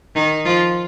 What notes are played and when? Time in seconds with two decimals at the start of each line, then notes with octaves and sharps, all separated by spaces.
0.16 D#3 D#4
0.45 F3 F4